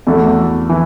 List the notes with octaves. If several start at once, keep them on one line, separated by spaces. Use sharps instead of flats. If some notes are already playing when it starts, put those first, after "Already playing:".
E2 E3 A3 F#4
E3